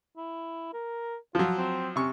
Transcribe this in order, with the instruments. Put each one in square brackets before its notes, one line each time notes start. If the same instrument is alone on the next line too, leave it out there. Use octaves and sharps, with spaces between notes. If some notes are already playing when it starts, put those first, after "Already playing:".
[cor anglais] E4
A#4
[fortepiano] F3 F#3 [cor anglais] F4
[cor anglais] C4
[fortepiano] C3 C#6 [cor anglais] C#4